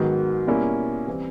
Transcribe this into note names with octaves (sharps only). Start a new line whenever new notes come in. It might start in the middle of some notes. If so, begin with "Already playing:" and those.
Already playing: G#2 D#3 F#3 B3
B2 G3 A#3 C#4 E4
E3 G3 C4